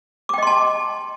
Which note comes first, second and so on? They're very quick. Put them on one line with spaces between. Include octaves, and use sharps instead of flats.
D6 G5 D#5 C6 A5